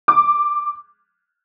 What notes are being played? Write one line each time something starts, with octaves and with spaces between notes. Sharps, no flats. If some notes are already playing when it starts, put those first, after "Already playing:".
D6